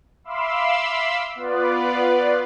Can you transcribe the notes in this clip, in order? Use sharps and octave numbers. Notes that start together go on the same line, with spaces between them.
E5 F5 B5 C6 D6 E6
B3 F4 B4 D5